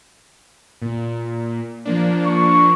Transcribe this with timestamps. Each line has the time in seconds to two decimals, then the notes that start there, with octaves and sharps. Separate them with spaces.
0.82 A#2
1.85 F3 A#3 D4
2.26 C#6